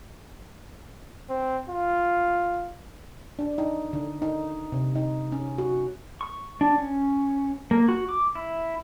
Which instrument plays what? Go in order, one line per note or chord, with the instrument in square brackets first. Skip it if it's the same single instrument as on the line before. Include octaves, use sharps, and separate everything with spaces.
[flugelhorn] C4
F4
[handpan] D4
D#4
D3
D#4
C3
D#4
C#4
F#4
[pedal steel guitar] C#6
D4
C#4
A#3
F#4
D6
E4